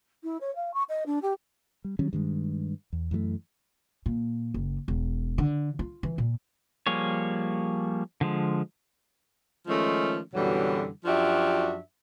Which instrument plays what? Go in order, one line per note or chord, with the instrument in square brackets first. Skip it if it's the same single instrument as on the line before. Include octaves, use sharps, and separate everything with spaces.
[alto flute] E4
C#5
F5
C#6
D#5
D4
G4
[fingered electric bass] G3
D#3 F#3 G3 C#4
G2 D#3 G#3
E2
F#2 E3 F#3 A3
[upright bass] A#2
F#1
E1
D3
F4
E3
A#2
[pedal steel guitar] F3 G3 A#3 G#4 C#5
D3 F3 G#3
[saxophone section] D#3 F3 G#3 A3 C#4
F#2 B2 D3 E3 F#3 G3
F#2 F3 D4 F#4 G4 E5